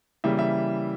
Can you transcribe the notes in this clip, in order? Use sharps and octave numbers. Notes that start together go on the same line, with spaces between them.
C#3 E3 G3 A#3 E5
E5